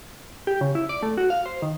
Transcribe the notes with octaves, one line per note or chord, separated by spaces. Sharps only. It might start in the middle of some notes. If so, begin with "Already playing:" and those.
G4
C#3
E4
D5
A3
F#4
F5
C5
D#3